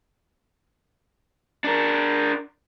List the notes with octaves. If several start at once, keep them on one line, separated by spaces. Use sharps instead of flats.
D4 A#4